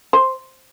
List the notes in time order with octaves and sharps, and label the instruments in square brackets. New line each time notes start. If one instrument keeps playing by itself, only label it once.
[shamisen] C5